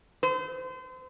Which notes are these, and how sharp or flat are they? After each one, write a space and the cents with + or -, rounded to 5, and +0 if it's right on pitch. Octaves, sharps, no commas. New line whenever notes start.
C5 -35